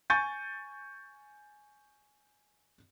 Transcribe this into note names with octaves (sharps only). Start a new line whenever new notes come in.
G#5 C#6 G6 A6 D#7